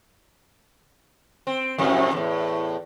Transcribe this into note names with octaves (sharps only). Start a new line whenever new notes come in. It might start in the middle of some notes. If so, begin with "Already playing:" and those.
C4
F2 A2 C3
E2 A2